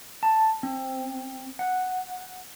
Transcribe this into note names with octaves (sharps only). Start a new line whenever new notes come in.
A5
C4
F#5